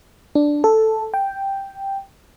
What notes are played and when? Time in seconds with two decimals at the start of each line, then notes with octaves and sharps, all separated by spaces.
0.35 D4
0.64 A4
1.14 G5